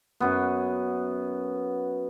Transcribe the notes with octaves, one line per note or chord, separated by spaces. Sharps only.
F#2 B3